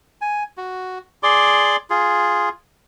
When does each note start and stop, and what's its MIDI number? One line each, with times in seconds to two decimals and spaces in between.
0.21 0.43 80
0.57 0.99 66
1.23 1.76 68
1.23 1.76 74
1.23 1.76 84
1.23 1.76 86
1.90 2.49 65
1.90 2.49 68